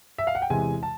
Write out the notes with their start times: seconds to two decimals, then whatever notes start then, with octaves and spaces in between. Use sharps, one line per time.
0.18 E5
0.27 F5
0.35 F#5
0.42 G5
0.50 E2 C3 E3 G#3 G#5
0.83 A5